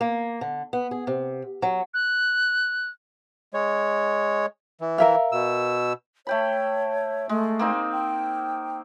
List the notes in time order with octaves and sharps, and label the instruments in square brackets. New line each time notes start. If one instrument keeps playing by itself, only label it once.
[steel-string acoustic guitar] A#3
D3
B3
G#4
C3
F#3
[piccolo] F#6
[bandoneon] G#3 C#5
E3
[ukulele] A#4 E5 F5
[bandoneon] B2 E6
[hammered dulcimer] A3 G5 B5 [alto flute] C#5
[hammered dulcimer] G#3 [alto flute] A3
[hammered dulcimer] A#3 C4 D#4
[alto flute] G5